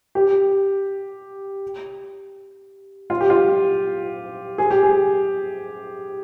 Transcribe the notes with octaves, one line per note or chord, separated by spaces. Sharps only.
G4
F4
G4
F4
G#4
G4
G#4